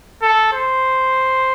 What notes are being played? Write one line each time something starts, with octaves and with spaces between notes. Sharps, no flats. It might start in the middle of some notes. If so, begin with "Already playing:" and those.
A4
C5